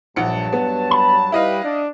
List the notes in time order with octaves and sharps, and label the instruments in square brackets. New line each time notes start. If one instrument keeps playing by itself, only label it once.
[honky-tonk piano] A#1 F#5 C#7 [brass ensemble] G2 F#3 A5
[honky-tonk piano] B3
[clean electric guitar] B5
[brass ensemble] G3 G4 B4 [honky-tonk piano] E4 D#5 F5
[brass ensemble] D4